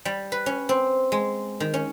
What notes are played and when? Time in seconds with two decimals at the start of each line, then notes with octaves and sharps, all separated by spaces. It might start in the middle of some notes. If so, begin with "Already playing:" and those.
0.05 G3
0.32 B4
0.46 C#4
0.69 C4
1.12 G#3
1.60 D#3
1.74 C#4